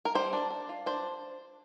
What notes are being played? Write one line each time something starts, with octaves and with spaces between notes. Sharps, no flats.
A#4
G3 C5
D4
D4
F4
D4 C5